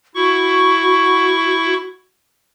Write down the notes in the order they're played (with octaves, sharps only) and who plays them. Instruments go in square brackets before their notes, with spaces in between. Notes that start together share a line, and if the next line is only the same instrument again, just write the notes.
[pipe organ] E4 C#6 [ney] F#4